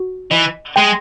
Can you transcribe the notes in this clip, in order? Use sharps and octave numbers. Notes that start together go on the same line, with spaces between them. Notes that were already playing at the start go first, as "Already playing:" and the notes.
Already playing: F#4
E3 D#5
G#3 G5